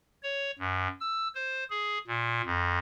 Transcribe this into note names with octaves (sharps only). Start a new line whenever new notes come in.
C#5
F#2
E6
C5
G#4
A#2
F2